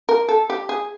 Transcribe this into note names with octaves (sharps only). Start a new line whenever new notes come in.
A#4
A4
G4
G#4